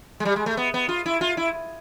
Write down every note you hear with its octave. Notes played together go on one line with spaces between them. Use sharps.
G#3
G3
G#3
A3
B3
B3
F4
E4
F4
E4